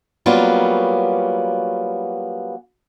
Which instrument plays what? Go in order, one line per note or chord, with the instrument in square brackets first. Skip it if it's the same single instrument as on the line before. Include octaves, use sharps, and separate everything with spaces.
[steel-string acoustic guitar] F#3 G3 A#3 B3 C#4 F4